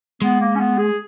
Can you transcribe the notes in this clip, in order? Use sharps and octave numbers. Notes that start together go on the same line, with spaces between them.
G#3 B3
A#3
C#4
B3
G#4